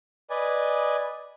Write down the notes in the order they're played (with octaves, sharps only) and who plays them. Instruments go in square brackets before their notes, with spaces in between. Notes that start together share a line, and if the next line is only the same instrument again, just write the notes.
[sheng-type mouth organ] B4 D5 D#5 G#5